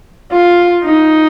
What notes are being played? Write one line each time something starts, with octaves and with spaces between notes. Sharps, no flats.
F4
D#4